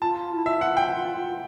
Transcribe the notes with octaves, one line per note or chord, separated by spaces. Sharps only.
F4 A5
E4
F4 E5
F#5
G5